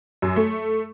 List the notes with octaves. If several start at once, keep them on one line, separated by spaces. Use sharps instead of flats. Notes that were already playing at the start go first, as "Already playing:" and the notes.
F#2
A3